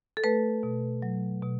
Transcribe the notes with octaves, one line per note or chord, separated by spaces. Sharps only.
A4
A3 B4
B2
F#3
B2